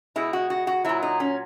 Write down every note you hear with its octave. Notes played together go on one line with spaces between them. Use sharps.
B2 G#3 E4
F#4
F#4
F#4
A#2 F#3 E4
D#4
C#4